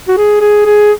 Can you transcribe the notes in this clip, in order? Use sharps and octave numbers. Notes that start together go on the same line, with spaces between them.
F#4
G#4
G#4
G#4